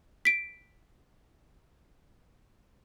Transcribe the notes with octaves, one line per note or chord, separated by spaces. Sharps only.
B6 D7